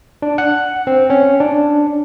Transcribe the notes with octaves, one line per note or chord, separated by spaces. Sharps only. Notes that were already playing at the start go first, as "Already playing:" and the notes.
D4
F#5
C4
C#4
D4